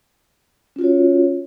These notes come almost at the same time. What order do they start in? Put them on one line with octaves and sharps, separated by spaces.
C#4 F4 F#4 C#5